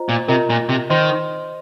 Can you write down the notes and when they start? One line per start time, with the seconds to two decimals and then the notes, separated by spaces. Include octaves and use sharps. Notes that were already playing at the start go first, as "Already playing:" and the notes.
Already playing: F4 C5 D#5 A#5
0.09 A#2
0.28 C3 F4 A#4 D#5 A#5
0.50 A#2
0.69 C3
0.90 D#3 C5 D#5 C6